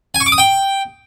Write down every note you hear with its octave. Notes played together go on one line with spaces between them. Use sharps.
G#5
C#6
D6
D#6
G5